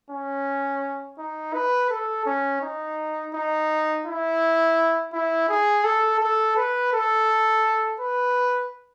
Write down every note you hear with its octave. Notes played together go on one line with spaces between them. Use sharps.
C#4
D#4
B4
A4
C#4
D#4
D#4
E4
E4
G#4
A4
A4
B4
A4
B4